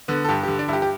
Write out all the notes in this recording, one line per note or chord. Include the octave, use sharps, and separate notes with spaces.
D3 B3
A4
G2 G4
D3 G4
D4
G2 E4 G4
G4